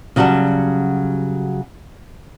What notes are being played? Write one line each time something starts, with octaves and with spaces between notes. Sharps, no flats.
C#3 F#3 G3 F#4 A5